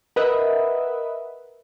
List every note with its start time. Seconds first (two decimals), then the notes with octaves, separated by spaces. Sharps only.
0.16 A#4 B4 D#5 E5 F#5